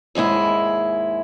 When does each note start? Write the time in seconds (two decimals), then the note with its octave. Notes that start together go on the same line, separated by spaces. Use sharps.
0.15 D#2 G#2 G#3 E4